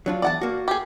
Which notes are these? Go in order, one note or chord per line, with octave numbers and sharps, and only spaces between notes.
F#3 D4 F4
E2 D5 F#5 A5
A#3 F#4
G4 G#4